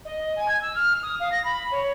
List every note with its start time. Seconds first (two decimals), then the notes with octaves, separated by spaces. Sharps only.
0.05 D#5
0.36 G#5
0.48 G#6
0.61 E6
0.75 F6
1.02 D#6
1.19 F5
1.31 A#6
1.44 B5
1.71 C#5